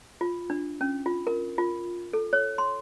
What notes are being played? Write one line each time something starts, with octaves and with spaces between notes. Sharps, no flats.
F4
D4
C#4
F4
A#4
F4
A4
C#5
C6